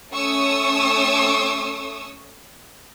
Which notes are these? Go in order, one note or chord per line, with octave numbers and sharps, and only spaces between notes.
A3 C#4 C#6 D#6 E6